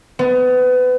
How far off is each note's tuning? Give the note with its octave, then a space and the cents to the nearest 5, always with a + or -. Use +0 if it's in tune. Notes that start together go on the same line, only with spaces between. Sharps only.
B3 +30